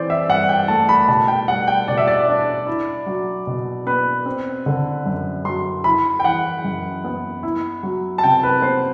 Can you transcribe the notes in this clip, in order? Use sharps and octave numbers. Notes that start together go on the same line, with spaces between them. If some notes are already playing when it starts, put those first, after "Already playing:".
Already playing: E3 C4 C5 D5
E5
G2 F#5
G5
A3 A5
B5
B2 A5
G5
G3 F#5
G5
B2 D5
E5
D5
D4
E4
F#3
B2
B3 B4
C4
D3
F#2
F#3 C6
E4 B5
G5
E3 F#5
F#2
B3
E4
F#3
A5
C3 G5
B4
B3 C5